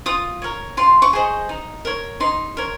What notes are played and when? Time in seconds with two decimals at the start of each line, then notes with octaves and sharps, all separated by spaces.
0.06 F4 D#6
0.42 A#4 C#5
0.77 F4 C6
1.02 C#6
1.13 G#4 C5 D#5
1.49 D#4
1.85 A#4 C#5
2.20 D#4 C6
2.57 A#4 C#5